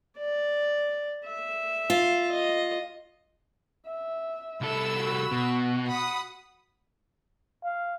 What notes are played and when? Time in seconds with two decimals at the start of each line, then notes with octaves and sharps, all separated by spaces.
0.18 D5
1.25 E5
1.90 F4
2.31 D#5
3.87 E5
4.61 C2 A4 B5 E6
4.99 F#4
5.31 B2
5.87 F#5 B5 D#6
7.64 F5